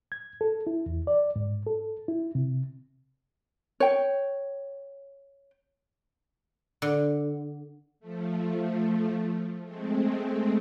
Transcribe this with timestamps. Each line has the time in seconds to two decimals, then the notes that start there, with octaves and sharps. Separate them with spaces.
0.12 G#6
0.41 A4
0.67 E4
0.86 E2
1.07 D5
1.36 G#2
1.66 A4
2.08 E4
2.35 C3
3.80 C#5 G5
6.82 D3
8.00 F3 A3
9.64 G#3 A3 C4